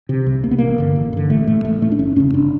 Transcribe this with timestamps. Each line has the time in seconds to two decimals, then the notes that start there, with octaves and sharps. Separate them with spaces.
0.09 C3
0.27 C2
0.44 C3 A#3
0.51 B3
0.58 A1 A#3
0.78 G2 D3
0.96 A1
1.13 G2 D3
1.30 A1 A3
1.47 A2 A3
1.65 A1 A3
1.82 A2 A3
1.92 D4
1.99 G1 C#4
2.16 F2 C#3 C#4
2.34 G1 D4